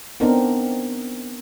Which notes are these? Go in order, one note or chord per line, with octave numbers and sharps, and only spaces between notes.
B3 C4 D4 D#4 A#4